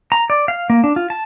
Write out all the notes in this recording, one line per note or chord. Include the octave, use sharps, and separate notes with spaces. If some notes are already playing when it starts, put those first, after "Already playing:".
A#5
D5
F5
A#3
D4
F4
A5